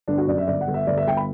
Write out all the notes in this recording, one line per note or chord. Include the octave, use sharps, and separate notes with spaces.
G1 D4
F#4
F#2 D5
E5
G1 D5
F#5
G1
E5
G1 D5
E5
G1 G5
B5